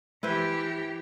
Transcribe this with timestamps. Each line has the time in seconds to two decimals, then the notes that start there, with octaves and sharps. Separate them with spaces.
0.23 E3 E4 G4 B4 C5